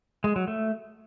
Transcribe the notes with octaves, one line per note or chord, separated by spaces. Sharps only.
G#3
F#3
A3